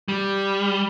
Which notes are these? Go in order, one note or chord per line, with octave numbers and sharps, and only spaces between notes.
G3